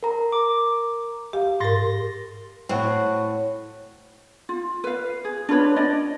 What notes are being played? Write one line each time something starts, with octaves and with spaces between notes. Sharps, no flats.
A#4 A#5
D6
G4 F5
G#2 A#4 C6 A6 A#6
A2 C4 F#4 C#5
F4
B4 F5
G#4
D4 F4 B4 C#5
D4 D5 D#5